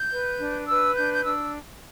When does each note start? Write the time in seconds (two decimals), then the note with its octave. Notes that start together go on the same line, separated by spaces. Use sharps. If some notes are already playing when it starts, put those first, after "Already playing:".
Already playing: G6
0.10 B4
0.39 D4
0.67 B4 E6
0.95 D4 G6
1.13 G6
1.24 D4 E6